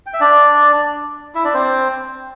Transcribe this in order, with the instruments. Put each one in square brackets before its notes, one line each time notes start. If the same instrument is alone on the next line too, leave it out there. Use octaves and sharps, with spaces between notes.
[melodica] G5
E5
D4 D5
E4 E5
D4 D5
C4 C5